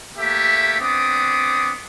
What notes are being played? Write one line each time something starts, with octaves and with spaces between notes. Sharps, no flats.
A3 A#3 G4 E5
B3 C4 D4 D6 D#6